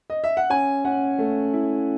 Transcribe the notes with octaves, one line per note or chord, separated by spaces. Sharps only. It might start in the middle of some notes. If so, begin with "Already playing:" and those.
D#5
E5
F#5
C#4 G#5
C#4 F#5
A3
E4